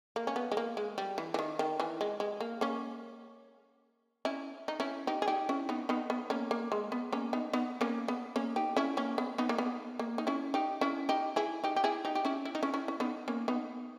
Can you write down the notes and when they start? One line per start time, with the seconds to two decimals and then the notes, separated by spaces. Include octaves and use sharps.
0.16 A#3
0.27 C#4
0.36 B3
0.52 G#3
0.57 A#3
0.77 G#3
0.98 G3
1.18 E3
1.34 E3
1.39 D#3
1.59 D#3
1.80 E3
2.01 G#3
2.20 G#3
2.41 A#3
2.61 A#3 C#4
4.25 C#4 E4
4.68 D#4
4.80 C#4 E4
5.07 D#4 G4
5.22 G#4
5.28 D#4 G4
5.49 C#4 E4
5.69 B3 D#4
5.89 B3 D#4
6.10 B3
6.30 A#3 C#4
6.51 A#3
6.72 G#3
6.92 B3
7.13 A#3 C#4
7.33 B3 D#4
7.53 B3 D#4
7.81 A#3 C#4
8.08 B3
8.36 A#3 C#4
8.56 D#4 G4
8.77 C#4 E4
8.97 A#3 C#4
9.18 B3
9.38 B3 D#4
9.49 A#3
9.58 B3
9.99 A#3
10.18 D#4
10.27 C#4 E4
10.54 D#4 G4
10.81 C#4 E4
11.09 D#4 G4
11.36 E4 G#4
11.64 D#4 G4
11.76 G4
11.84 E4 G#4
12.05 D#4 G4
12.15 G4
12.25 C#4 E4
12.45 E4
12.55 D#4
12.63 C#4 E4
12.74 C#4 E4
12.88 C#4
13.00 B3 D#4
13.28 A#3 C#4
13.48 B3 D#4